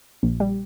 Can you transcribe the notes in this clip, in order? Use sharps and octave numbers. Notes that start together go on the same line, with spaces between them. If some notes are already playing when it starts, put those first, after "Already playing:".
A#1
G3